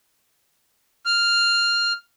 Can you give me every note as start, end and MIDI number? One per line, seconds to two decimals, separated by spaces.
1.06 1.93 89